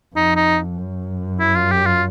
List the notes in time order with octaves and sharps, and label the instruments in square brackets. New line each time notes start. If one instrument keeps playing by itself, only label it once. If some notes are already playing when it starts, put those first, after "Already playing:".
[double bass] F2 [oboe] D#4
[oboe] D#4
[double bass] F#2
[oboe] E4
F4
G4
F4